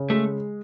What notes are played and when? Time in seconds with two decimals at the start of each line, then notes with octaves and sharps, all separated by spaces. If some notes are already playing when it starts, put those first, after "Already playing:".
Already playing: C#3
0.10 G#3 A3